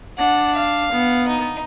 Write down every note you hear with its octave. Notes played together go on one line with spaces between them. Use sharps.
D4 F#5
F5
B3
D#4